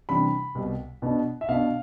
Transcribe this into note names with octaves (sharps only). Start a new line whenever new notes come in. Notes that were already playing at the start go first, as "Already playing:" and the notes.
C3 E3 G3 D4 B5
C2 B2 G3
B2 B3 D4
E5
B2 B3 D4 F5